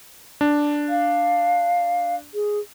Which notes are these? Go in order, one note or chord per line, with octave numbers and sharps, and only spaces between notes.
D4
F5
G#4